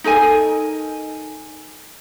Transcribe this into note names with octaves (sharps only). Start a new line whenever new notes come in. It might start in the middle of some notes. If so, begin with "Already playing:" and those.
D#4 A4 A#4 G#5